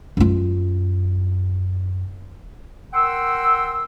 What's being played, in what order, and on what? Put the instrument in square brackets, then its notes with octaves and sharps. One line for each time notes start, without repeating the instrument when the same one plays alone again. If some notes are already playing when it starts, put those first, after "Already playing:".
[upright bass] F#2 F4
[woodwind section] A#4 F#5 G5 C6 E6